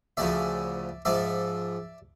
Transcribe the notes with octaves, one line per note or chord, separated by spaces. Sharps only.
D2 C#3 F3 D5 E5
G#2 F3 D5 E5